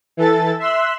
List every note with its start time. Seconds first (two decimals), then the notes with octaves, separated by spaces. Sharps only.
0.17 E3 A4 A6
0.59 E5 C6 E6 F#6